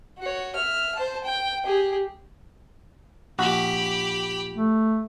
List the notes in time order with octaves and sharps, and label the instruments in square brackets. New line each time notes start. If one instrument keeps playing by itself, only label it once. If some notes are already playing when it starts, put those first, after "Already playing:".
[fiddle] F#4 C#5
E5 F6
C5 A5
G5
G4 G#4
[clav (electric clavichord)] A#1 F#4 [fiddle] G4 B5
[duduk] A3